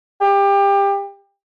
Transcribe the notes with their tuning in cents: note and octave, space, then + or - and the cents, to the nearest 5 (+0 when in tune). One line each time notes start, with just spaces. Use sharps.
G4 +25